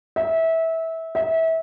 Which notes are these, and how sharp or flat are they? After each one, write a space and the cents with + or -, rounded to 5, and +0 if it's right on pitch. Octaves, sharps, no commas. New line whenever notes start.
E5 -20
E5 -25